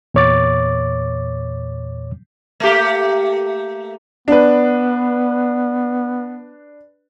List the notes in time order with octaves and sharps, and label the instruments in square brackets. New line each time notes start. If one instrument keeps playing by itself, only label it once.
[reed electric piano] E2 A#2 C#5 D6 A6
[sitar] A3 A#3 G4
[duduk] B3 [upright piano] D4 B4